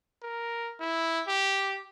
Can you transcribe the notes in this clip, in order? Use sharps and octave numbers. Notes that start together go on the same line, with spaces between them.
A#4
E4
G4